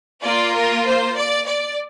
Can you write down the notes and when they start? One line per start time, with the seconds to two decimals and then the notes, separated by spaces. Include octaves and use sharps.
0.23 A#3 F4 D5
0.53 A#4
0.85 C5
1.15 D5
1.46 D5